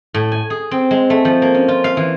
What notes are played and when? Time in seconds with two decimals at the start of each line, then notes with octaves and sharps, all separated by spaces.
0.14 A2
0.32 G#5
0.50 G#4
0.71 C4
0.91 G#3
1.10 A3
1.25 F3
1.42 A#3
1.54 C#4
1.68 F4
1.84 F5
1.97 E3